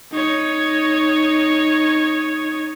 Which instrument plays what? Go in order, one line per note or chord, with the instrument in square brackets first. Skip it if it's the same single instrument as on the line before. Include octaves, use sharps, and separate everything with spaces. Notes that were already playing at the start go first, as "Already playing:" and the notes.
[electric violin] D#4 C#5